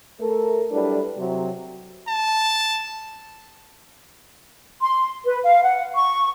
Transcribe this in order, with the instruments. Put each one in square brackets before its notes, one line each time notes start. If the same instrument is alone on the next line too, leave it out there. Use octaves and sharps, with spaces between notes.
[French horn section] A3 A4 A#4
F#3 G3 D4 E4 A4 B4
C3 F#3
[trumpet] A5
[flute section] C6
B4
F5
F#5
C#6